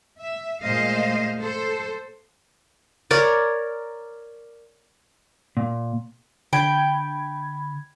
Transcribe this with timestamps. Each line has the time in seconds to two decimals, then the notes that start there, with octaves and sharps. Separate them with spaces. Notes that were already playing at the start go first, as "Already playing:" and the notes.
0.19 E5
0.61 A#2 G#3 A3 C5 D#5 F5
1.40 A4 C5
3.11 A#4 C#5 D5
5.57 A#2
6.53 D3 G5 B5 G#6